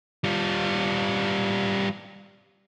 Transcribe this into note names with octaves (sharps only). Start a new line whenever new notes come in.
G3 F4